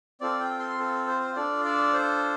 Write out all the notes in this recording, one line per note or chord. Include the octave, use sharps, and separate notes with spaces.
C4 F4 A4 D5
G5
C6
A4
C5
D4 F4 A4 D5
D5
C5